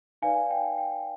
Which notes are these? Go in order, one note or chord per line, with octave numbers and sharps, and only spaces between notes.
D#4 B4 D5 F5 G#5
G5
G5